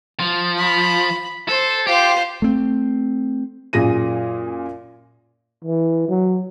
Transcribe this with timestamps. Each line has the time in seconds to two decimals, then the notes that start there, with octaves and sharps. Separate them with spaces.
0.20 F3
0.58 B5
1.48 A4 C5
1.87 F4 G4 C5
2.42 A3 C4
3.73 F#2 A#2 G#4 A#6 D#7
5.65 E3
6.08 F#3